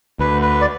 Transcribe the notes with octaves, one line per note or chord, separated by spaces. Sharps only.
D2 B4
B4
D5